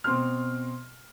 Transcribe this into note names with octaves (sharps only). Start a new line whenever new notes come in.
B2 C4 C6 F6